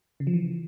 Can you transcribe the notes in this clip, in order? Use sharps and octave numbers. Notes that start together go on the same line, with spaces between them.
C#3
F3
E3